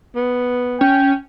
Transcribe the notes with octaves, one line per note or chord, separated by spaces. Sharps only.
B3
C#4 G5